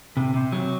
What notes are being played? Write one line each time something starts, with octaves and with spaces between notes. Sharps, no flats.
C3
C3
F#3